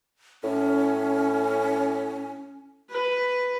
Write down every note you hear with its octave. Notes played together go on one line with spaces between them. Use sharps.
A2 C#4
B4